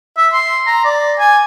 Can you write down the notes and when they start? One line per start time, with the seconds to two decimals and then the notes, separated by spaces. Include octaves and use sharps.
0.17 E5
0.33 C6
0.67 A#5
0.84 D5
1.19 G#5